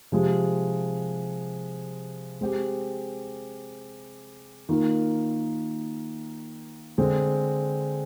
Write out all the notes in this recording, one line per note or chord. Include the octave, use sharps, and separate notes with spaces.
C3 F3 G#3
G#3 C4 G4
D#3 A#3 F4 A#4
D3 G#3 C4